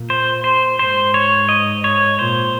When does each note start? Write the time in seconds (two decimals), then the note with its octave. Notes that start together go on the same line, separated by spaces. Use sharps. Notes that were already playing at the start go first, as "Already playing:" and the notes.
Already playing: A#2
0.10 C5
0.44 C5
0.79 G#2 C5
1.14 C#5
1.49 D#5
1.84 C#5
2.19 A#2 C5